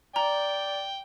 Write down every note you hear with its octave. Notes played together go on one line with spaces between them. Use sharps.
D5 G5 A#5